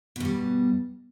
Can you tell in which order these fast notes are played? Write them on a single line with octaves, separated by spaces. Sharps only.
B2 G2 G3